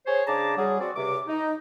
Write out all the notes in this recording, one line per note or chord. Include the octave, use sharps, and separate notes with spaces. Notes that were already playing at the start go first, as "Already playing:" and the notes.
G#4 C5 C#5
C#3 D4 G#4 A5 A#5 D6
F#3 G3 G#4
C4 F#4 D5
C#2 C3 D6
D#4